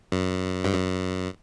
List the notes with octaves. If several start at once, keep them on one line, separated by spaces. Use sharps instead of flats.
F#2
G2
F#2